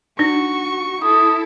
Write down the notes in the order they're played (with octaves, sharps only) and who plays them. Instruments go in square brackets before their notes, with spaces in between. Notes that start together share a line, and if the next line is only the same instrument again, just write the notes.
[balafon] D4 D#4 [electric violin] F#4 C#6
[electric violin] E4 A4 [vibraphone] D#6